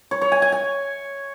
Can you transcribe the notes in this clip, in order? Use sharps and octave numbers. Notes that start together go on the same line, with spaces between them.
C#5
C#5
G#5
G#5
G#5